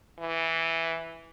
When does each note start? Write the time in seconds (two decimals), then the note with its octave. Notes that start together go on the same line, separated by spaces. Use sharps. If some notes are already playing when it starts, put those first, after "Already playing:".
0.19 E3